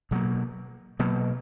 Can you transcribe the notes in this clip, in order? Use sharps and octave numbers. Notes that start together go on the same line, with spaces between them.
B2 F#3 A#3
B2 F#3 A#3